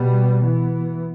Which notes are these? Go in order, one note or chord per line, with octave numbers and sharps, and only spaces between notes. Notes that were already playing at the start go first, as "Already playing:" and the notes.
Already playing: B2 G3 B3
E3 B3